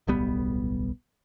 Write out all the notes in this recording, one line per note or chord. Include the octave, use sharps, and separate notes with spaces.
D1 B1 G3 B3